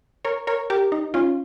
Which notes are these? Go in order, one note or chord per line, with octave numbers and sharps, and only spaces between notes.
A#4 C#5
A#4 C#5
G4 A#4
D#4
C#4 F4